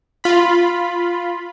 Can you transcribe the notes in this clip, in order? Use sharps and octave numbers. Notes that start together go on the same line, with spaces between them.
F4 B5